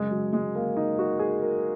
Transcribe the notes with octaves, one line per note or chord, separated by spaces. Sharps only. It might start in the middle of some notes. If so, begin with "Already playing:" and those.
Already playing: F#2 C#3 G#3
F#3
G#3
A#3
D#4
F#4
G#4
A#4